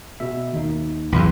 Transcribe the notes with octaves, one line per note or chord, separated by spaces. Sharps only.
B2 E5
D#2 D#4
B1 E2 E3 C6